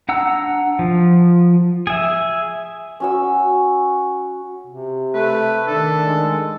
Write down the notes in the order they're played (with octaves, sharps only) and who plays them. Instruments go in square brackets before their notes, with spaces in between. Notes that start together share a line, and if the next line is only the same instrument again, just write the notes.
[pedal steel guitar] D4 F#5 A#5 E6
F3
G#4 E5
[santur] C#4 F#4 E6
[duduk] C3
[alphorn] A3 [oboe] B4
[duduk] D#3 [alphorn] D4 [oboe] A4
[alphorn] G#3